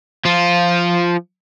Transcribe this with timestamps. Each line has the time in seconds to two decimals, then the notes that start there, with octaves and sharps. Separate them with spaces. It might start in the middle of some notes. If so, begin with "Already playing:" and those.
0.25 F3 F4